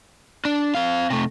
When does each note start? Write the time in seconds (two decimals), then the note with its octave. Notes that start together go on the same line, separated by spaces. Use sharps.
0.45 D4
0.75 C4 F5
1.10 C3 A3